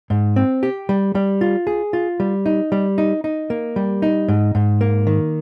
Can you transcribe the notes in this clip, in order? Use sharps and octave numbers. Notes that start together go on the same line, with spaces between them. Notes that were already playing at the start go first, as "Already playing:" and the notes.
G#2
C4
G4
G3
G3
F4
G#4
F4
G3
D#4
G3
D#4
D#4
A#3
G3
D#4
G#2
G#2
A#3
D#3